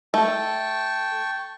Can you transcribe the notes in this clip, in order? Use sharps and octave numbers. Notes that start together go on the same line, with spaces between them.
A3 G5 A5 C#6